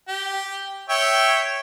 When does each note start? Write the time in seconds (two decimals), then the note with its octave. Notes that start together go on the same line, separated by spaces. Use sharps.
0.08 G4
0.89 C#5 E5 G5